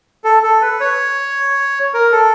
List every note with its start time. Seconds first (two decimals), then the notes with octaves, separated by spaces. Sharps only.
0.24 A4
0.43 A4
0.62 B4
0.80 C#5
1.94 A#4
2.12 A4